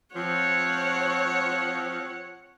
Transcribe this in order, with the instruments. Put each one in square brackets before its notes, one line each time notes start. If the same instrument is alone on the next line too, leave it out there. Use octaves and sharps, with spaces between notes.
[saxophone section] F3 C4 [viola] C#5 F#5